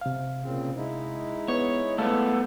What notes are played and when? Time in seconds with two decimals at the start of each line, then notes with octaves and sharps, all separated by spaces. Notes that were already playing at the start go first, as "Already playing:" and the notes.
0.01 C3 F5
0.42 A#2 C#3 C4
0.76 G#3 D#4 E4
1.48 B3 C#5
1.98 A3 B3 F5 A5 E6